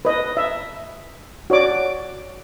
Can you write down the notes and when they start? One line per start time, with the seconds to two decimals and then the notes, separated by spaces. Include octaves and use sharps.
0.05 B4 D#5
0.37 E5
1.50 F#4 C#5 D5 D6